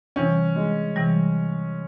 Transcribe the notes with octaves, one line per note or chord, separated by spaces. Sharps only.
C3 E3 G3 C#4
G#3
C3 E3 G3